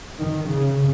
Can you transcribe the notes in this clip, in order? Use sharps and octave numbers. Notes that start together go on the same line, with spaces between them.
D#3
C#3